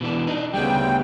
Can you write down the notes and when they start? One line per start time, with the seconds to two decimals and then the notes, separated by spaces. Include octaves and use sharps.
0.01 B2 E3 D4
0.27 D4 D#4
0.54 D2 C#3 G3 B3 G5